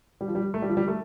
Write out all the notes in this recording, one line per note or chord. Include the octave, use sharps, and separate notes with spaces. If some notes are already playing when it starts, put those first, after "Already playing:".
G3
F3
G3
A3
G3
F3
G3
A3